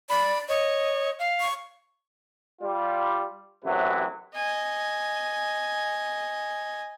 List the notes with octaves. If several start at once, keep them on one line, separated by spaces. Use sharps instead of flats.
D5 B5
C#5 D#5
F5
C#6
G3 F4
A1 F#2 C3 F#3 E4 B4
D#5 G#5